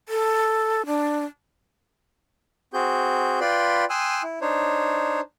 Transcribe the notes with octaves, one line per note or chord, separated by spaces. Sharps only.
A4
D4
C4 F#4 G#4 G6
F4 B4 D5 G5 B5 C6
G5 G#5 C6 D#6 E6 F#6
E4
D4 D#4 C5 C#5